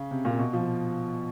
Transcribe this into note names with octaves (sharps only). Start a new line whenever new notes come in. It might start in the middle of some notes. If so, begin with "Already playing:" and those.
Already playing: C#3
C3
A#2
B2
F3